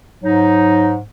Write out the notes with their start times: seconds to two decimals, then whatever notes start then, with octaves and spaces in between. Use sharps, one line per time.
0.21 G#2 F#3 D#4